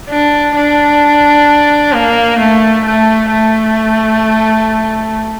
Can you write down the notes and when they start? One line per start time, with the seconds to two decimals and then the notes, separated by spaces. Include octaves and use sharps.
0.09 D4
0.56 D4
1.93 A#3
2.39 A3
2.85 A3
3.31 A3